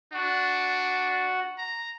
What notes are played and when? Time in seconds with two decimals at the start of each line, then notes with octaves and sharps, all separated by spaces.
0.13 D4 F#4
1.58 A#5